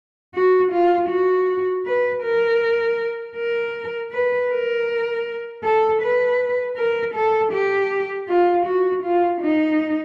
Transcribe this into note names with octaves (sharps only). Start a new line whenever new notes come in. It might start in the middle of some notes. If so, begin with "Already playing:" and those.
F#4
F4
F#4
B4
A#4
A#4
B4
A#4
A4
B4
A#4
A4
G4
F4
F#4
F4
D#4